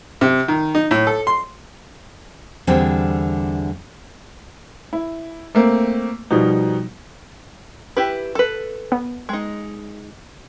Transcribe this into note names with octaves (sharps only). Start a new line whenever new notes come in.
C3
D#3
D#4
A2
A4
C6
E2 D3 G3 C4
E4
A3 A#3 C4
B2 F3 G3 D#4
E4 G4 B4
A4 B4
B3
G#3 D#4